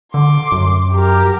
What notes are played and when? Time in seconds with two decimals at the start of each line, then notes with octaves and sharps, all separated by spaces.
0.14 D3 C6 D6
0.52 F#2
0.93 G4 A#4